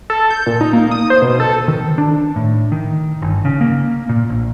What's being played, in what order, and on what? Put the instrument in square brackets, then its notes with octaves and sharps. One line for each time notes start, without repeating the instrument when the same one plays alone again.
[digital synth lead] A4
G6
A#2
D#4
A#3
D#6
C5
B2
A4
[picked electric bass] D#3
D4
A2
D#3
G1
C#3
A#3
A#2
A#1